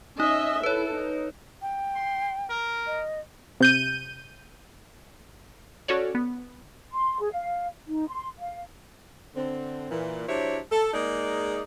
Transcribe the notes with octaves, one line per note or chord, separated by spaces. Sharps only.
C#4 D#4 D#5 E5
E4 A4 B4 C#5
D#4
G5
C6
A#4
D#5
C3 G6 D#7
C#4 F#4 A4 C#5 D5
B3
C6
G#4
F5
D#4
C6
F5
D3 C4
A#2 E3
F#3 D4 E4 G4 C5 C#5
A4
G#3 A#3 D#4 G#4 D5